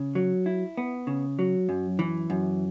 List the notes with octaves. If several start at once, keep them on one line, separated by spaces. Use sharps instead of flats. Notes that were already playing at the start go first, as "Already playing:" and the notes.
Already playing: C#3
F#3
E4
B3
C#3
F#3
F#2
E3
F#2